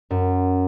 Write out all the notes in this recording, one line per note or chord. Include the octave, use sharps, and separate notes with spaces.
F#2